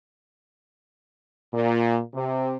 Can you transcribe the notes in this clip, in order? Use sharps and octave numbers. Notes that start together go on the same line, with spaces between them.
A#2
C3